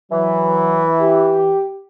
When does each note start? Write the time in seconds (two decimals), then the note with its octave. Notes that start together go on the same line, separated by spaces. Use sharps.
0.11 E3 F#3
1.00 G4